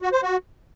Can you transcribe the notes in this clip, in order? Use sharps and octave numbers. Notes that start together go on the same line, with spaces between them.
F#4
C5
F#4